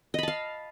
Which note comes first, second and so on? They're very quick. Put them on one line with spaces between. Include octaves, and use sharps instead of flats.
D#5 B5 A5 F5